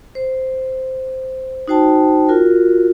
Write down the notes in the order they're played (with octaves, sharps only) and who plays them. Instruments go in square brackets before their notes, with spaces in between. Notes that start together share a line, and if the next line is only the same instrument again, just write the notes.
[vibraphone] C5
D#4 F#4 C5 G5 A5
F4 F#4 A#4